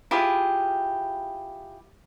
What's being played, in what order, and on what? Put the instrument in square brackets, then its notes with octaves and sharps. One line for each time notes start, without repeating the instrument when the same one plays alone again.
[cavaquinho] E4 F4 G4 G#4